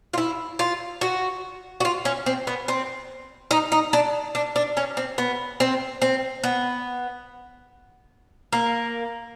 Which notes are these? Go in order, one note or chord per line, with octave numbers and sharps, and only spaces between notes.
F4
E4
F4
F#4
F#4
F4
C#4
C4
B3
C4
D#4
D#4
D4
D4
D4
C#4
C4
B3
C4
C4
B3
A#3